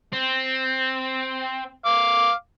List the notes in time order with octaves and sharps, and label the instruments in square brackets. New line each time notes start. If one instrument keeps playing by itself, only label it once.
[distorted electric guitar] C4
[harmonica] F5 D6